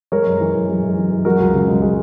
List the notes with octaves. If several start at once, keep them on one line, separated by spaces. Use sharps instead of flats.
G#3 A#4 C#5
F#2
E3
F#2
G#3
F#2
E3
F#2
G#3 F#4 A#4
C#2
C#3
C#2
G#3